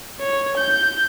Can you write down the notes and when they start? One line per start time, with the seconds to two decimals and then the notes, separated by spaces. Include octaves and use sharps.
0.20 C#5
0.58 G6